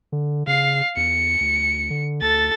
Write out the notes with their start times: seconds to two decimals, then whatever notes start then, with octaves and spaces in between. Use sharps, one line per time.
0.12 D3
0.47 C#3 F5 C7
0.97 E2 C#7
1.40 D2
1.90 D3
2.21 D2 A4 A6